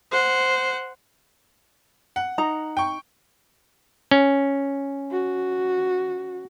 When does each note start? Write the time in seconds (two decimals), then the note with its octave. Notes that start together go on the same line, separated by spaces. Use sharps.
0.11 C5 F#5
2.16 F#5
2.38 D#4 A#5
2.77 G5 C#6
4.11 C#4
5.11 F#4